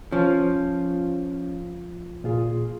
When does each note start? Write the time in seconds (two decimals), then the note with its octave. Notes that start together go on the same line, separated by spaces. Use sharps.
0.12 F3 C#4
2.24 A#2 F4 G#4